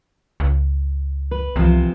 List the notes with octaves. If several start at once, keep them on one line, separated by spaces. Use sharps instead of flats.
C#2
B4
C2 C3 E3 F3